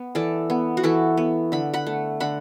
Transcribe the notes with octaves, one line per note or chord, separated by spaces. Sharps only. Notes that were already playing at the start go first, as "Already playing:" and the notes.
Already playing: B3
E3 A4 D5
B3
F#4
E3 E4 A4
B3
D3 B5
F#5 B5
A3
D3 F#5 B5